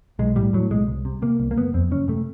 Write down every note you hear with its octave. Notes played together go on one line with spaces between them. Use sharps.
B1 G#3
A2 G3
A2 F#3
B1 G#3
C2
C3
C3 A#3
C2
A#3
F#1 B3
F2 C4
F#1 C#4
C3 A3